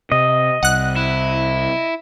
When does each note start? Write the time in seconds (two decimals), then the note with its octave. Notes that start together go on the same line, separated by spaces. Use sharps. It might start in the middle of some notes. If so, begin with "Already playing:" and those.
0.12 C3 D#5
0.63 C2 F#5 F#6
0.96 E4